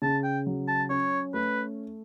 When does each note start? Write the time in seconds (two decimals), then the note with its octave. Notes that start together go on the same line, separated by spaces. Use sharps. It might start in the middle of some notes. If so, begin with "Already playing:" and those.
0.02 C#3 A5
0.24 G5
0.47 F#3
0.68 A5
0.90 C#4 C#5
1.34 A3 B4